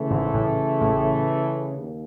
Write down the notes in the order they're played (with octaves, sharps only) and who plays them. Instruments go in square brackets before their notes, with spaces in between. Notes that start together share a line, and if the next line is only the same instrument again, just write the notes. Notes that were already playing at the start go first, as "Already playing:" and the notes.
Already playing: [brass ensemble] C#3 E3 A3
[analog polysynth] G#1 G#2
A1 A2
A1 A2
[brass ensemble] D#2